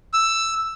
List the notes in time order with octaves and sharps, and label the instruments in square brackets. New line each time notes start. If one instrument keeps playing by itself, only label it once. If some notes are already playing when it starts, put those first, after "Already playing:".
[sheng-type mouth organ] E6